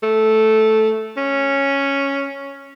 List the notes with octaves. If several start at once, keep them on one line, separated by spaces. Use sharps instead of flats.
A3
C#4